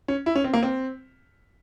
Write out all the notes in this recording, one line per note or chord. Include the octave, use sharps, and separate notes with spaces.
C#4
E4
C#4
C4
A#3
C4